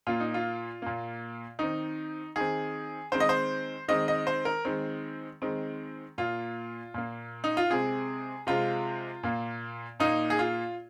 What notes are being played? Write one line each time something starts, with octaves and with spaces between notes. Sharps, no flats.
A#2 A#3 F4
D#4
F4
A#2 A#3
D#3 C4 D#4
D#3 C4 G#4
D#3 G#3 C4 C5
D#5
C5
D#3 G#3 C4 D#5
D#5
C5
A#4
D#3 G#3 C4
D#3 G#3 C4
A#2 A#3 F4
A#2 A#3
D#4
F4
C3 G#3 C4 G#4
C3 G#3 C4 F4
A#2 A#3
A#2 A#3 D#4
G#4
F4